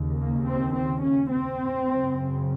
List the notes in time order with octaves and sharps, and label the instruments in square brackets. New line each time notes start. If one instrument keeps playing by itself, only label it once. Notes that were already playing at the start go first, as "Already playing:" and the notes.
Already playing: [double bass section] D#2 C#3
A#3
C4
C4
C#4
C4
F#2 C#3